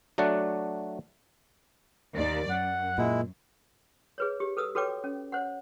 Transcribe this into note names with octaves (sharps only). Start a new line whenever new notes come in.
F#3 A3 D4 D5 F#5
D#2 D5
F#2 F#5
A#2 G#3 E4
G#4 B4 C#5
G4
A4 B4 D#6 E6
F#4 A4 B4 C#5 G5 D6
C#4
C5 C#5 F#5